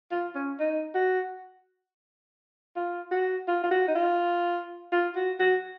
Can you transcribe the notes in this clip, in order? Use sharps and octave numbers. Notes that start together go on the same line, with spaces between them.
F4
C#4
D#4
F#4
F4
F#4
F4
F4
F#4
D#4
F4
F4
F#4
F#4